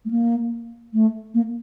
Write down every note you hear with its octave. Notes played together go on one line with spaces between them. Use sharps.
A3
A#3
A3
A#3